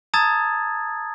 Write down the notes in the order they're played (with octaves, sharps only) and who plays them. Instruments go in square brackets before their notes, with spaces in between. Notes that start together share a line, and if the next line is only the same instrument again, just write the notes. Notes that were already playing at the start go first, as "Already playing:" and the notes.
[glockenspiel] A5 A#5 D#6 E6 G#6 A6